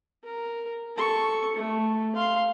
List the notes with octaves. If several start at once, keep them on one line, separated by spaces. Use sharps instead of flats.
A#4
A4 C#6
A3
F5 C6